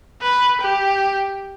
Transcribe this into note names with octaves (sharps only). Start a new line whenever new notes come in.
B4
G4